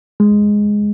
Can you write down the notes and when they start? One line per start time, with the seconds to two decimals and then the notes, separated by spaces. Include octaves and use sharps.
0.20 G#3